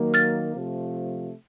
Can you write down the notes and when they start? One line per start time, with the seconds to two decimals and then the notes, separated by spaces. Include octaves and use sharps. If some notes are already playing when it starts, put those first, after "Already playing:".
Already playing: D#3 F#3 A#3
0.14 F6 A6
0.54 C3 F3 A3